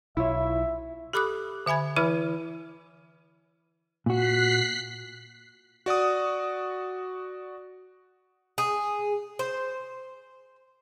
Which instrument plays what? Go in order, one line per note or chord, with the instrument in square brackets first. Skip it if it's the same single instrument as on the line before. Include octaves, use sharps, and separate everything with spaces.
[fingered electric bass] B1 [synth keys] E4 F4 C#5 [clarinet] E5
[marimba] G4 A4 B5 D6 D#6 F#6
D3 E5 G#5 B5 G#6
E3 E4 B4 E5 B5 F6
[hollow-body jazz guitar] A#2 F#4 [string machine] F#6 B6 C7
[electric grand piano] F#4 D5 F#5 D#6
[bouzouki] G#4
C5